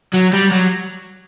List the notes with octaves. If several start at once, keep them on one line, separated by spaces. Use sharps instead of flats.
F#3
G3
F#3